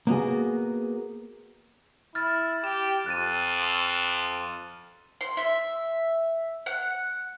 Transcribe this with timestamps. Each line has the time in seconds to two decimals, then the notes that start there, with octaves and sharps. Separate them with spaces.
0.07 A#3 B3 F#4 G#4
2.15 E4 F6 A6
2.64 G4 E7
3.06 F2 F#6 A6 D#7
5.21 C6
5.37 E5
6.66 F#5